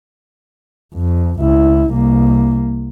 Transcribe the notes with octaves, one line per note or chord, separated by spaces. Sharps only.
F2
C#2 E4
C2 A#3